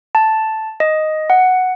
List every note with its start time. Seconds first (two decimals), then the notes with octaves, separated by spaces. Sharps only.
0.15 A5
0.80 D#5
1.30 F#5